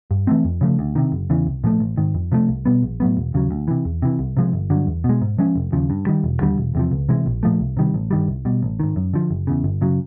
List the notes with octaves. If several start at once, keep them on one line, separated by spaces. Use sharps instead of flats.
G2
E3 A3 C4
F2
C#3 F3 A3
D2
C3 D#3
F#1
E2 C#3 E3
C2
A#2 F3 A3
A1
G#2 D#3
F2
C3 F3 A3
C2
B2 G3 B3
A#1
A2 F#3 B3
E1
D#2 C#3 F#3
D2
C3 E3
E2
C3 E3
C2
C3 F3 G#3
G1
G2 D3 F#3
E2
B2
G#3
G#2
F3 G#3 C#4
F1
D#2 C#3 F3
G2
D#3 G3
E1
D#2 D3 G3
E1
E2 C3 F3
C#2
C3 E3 G#3
A#1
A#2 F3 A3
C2
C3 D#3 G3
A1
G2 D#3 G3
C2
B2 G3
A1
G#2 D#3
F#2
D3 F3
F#1
E2 C#3
G1
F#2 C#3 F#3